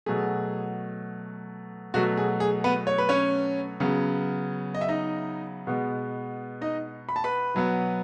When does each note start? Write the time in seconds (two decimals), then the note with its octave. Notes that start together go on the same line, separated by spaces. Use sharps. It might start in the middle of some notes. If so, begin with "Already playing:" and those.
0.06 B2 F#3 A3 G#4
1.94 B2 F#3 A3 F#4
2.17 G#4
2.40 G#4
2.64 B3 B4
2.87 C#5
2.98 B4
3.09 C#4 C#5
3.80 C#3 F#3 B3
4.75 D#5
4.81 E5
4.88 D#4 D#5
5.67 B2 G#3 B3
6.61 D#4 D#5
7.09 B5
7.16 A5
7.24 B4 B5
7.54 B2 F#3 B3